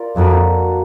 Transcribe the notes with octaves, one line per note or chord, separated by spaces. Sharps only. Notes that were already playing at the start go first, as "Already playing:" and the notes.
Already playing: F4 A#4 D5
F2 A#3 D4 F#4